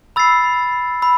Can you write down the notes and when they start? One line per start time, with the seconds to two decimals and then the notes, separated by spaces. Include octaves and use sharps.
0.16 B5 E6 A6 C7
1.02 B5 E6